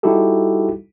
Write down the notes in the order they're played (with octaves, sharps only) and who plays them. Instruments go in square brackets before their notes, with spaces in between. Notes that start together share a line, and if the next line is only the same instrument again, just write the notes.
[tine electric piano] G3 D#4 E4 F#4 G4 A4